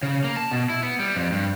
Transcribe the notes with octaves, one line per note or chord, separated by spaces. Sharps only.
C#3
A#3
A5
B2
E4
B3
G3
F2
G2